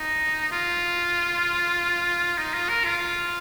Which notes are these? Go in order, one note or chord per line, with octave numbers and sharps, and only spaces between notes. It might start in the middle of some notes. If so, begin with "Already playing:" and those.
Already playing: D#4
F4
D#4
F4
A#4
F4